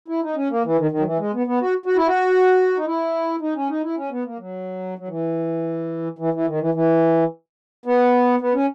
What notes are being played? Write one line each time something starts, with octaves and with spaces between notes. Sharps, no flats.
E4
D#4
C#4
A#3
E3
D#3
D#3
F#3
E3
G#3
B3
B3
F#4
F#4
E4
F#4
D#4
E4
D#4
C#4
D#4
E4
C#4
B3
A#3
F#3
F#3
E3
E3
E3
D#3
E3
E3
B3
B3
C#4